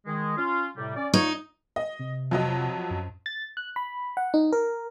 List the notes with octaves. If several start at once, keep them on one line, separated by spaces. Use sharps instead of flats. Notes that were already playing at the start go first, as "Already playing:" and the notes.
D#3 G#3
C#4 F4
A2 C3 G3
C#4 D5
D#4 F4 C#5
D#5
C3
F2 F#3 D#5
F#2
A6
F#6
B5
F#5
D#4
A#4